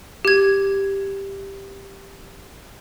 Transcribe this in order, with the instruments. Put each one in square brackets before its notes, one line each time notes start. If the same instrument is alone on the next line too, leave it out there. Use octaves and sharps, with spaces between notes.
[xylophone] G4 G#6